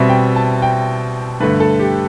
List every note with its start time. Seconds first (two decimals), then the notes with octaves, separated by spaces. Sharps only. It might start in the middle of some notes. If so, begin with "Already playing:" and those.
Already playing: B2 G3 C4 E5
0.09 G5
0.36 A5
0.62 G5
1.40 G2 D3 A3 B4
1.60 A4
1.79 G4